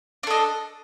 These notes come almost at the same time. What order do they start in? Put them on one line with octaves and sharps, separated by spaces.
D4 A4 D#5